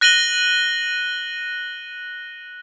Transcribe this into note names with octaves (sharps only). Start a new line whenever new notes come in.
F#6 A#6 D#7 F#7 G7